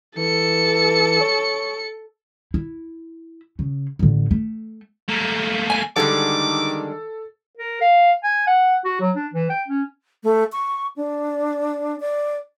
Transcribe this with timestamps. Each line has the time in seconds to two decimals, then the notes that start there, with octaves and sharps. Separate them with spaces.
0.17 E3 A4 C#7
1.21 C#5
2.54 E4
3.59 C#3
3.99 A1 D3
4.31 A3
5.09 A3 A#3
5.70 G#5
5.96 D3 D#3 G3 G#3 A4 D6
7.57 A#4
7.81 F5
8.23 G#5
8.47 F#5
8.84 F#4
9.00 F#3
9.16 D4
9.33 E3
9.50 G5
9.68 C#4
10.24 A3
10.53 C#6
10.96 D4
12.00 D5